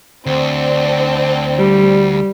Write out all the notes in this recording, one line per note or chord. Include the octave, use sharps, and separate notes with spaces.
D2 C4 D4
G3